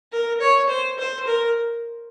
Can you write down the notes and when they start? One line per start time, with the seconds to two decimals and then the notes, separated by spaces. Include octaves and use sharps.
0.12 A#4
0.41 C#5
0.70 C5
0.98 C5
1.27 A#4